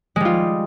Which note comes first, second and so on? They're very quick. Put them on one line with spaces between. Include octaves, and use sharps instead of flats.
G#3 G3 F4